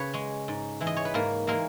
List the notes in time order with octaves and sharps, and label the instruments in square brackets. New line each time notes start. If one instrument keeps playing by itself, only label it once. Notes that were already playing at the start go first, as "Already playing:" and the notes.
Already playing: [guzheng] C#3 B4 C#5
G#3 C#4
G#2
E3 G#3
D#5
C#5
B4
G#2 A#3 A#4
E3 G#3 A#3 A#4